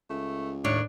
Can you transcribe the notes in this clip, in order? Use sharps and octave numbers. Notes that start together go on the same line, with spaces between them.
C#2 A3
D#2 A2 D4 C#5